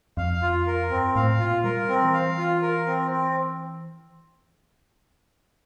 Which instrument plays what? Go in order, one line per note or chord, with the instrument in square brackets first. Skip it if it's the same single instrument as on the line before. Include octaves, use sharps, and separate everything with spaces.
[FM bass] F2 [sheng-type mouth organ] F5
[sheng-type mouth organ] F4
A#4
[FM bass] G2 [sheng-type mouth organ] C4
[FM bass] A2 [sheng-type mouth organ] F5
[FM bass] A#2 [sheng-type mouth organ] F4
[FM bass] G3 [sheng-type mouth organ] A#4
[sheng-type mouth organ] C4
[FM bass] E3
[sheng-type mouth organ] F5
F4
A#4
C4
C4